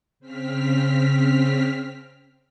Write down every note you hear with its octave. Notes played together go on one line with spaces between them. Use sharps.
C#3 C4 F6 B6